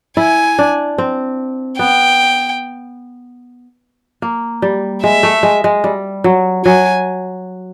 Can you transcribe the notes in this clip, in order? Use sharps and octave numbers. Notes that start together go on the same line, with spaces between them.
E4 G#5
D4
C4
B3 G5
A#3
G3
G#3 E5
A3
G#3
G#3
G3
F#3
F#3 G#5